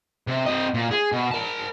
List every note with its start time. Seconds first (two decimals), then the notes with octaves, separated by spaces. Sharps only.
0.27 C3
0.46 C4 D#5
0.74 A#2
0.91 G#4
1.12 B2
1.31 A#4 A5